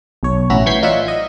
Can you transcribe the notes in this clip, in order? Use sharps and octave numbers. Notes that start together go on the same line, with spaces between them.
B1 C#5
A1 C#4 F#4 E5 A#5 B5
E3 C#6 G6 G#6 B6 C7
D#4 F4 C#5 D5 E5 F#5
D#5